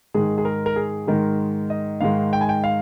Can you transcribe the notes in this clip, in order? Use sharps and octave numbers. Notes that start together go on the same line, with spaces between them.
G#2 D#3 G#3 G#4
G#4
A#4
A#4
G#4
G#2 D#3 G#3 A#4
D#5
G#2 D#3 G#3 F5
G5
G#5
G5
F5